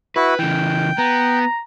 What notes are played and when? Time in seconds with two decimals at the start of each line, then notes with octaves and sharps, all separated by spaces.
0.16 E4 F#4 B4
0.39 C#3 E3 G5
0.98 B3 A#5